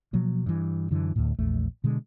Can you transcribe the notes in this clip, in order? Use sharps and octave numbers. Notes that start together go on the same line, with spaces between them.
B2 F3 F#3 A#3
G2 E3
F#2 D3 E3
D2 A2
A#1 E2 A3
B2 D3 G#3